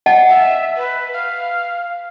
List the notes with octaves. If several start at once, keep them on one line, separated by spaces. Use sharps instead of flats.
D#5 F#5 A5
E5
B4
F5